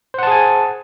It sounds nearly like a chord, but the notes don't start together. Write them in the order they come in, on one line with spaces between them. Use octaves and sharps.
C5 F#5 A5 G#4 G#5